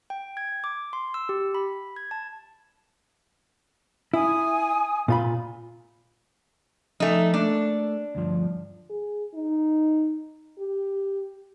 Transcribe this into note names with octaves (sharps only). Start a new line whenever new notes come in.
G5
G#6
D6
C6
E6
G4
B5
G#6
A5
E4 G#5 D#6
A#2 F4 B5
F3 A3 D#4 D5 G#5
A3 A#3 D4 A4
D2 G2 F3
G#4
D#4
G4